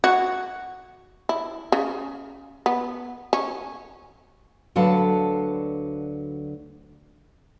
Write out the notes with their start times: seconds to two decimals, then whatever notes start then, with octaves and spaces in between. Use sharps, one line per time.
0.04 F#4
1.29 E4
1.72 C#3
2.66 B3
3.33 C#4
4.76 D2 D3 F#3 B4 F5 A5